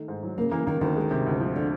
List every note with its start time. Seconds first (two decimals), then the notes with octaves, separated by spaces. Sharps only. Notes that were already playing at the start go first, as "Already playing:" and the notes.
Already playing: D#3 A3
0.08 G#2
0.23 F#3
0.37 C#3 A#3
0.51 E3 A#3
0.67 D#3 A#3
0.81 D2 D#3
0.96 G#3
1.11 C3
1.26 D2
1.40 F3
1.56 D3